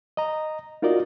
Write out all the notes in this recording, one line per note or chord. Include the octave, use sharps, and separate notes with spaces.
D#5 A#5
D#4 F4 F#4 A#4 D5 D#5